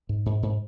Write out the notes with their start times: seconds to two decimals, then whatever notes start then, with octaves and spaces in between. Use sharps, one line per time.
0.09 G#2
0.26 G#2
0.43 G#2